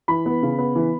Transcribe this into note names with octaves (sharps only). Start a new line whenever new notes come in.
E3 B5
B3
C#3
B3
E3